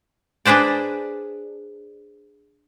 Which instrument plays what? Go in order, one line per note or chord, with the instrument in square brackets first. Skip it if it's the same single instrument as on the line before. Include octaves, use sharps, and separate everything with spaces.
[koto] D4 G#4 B4 C5 D5